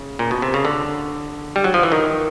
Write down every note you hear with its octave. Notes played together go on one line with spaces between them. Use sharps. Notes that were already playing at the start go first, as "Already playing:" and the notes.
Already playing: C#3
A#2
B2
C3
C#3
D3
G3
F#3
F3
E3
D#3